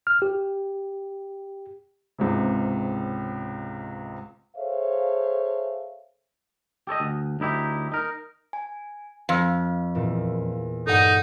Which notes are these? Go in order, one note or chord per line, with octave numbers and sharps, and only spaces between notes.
F6
G4
C#2 G#2 C3
G#4 A4 C5 C#5 E5 F5
G4 A4 C#5 D#5
D2
D2 D#4 E4 G4
D#4 A#4
G#5
F2 F5
E2 A#2 E3
G2 D#4 A4 D5 F#5